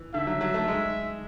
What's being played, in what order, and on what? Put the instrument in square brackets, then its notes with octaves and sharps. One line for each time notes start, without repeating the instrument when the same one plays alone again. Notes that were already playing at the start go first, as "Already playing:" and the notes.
Already playing: [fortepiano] E3
[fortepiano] D3 [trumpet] E5
[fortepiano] F#3
F#3
A3
G#3